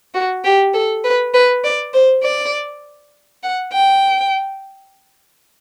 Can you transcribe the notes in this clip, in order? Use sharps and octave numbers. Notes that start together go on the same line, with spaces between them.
F#4
G4
A4
B4
B4
D5
C5
D5
F#5
G5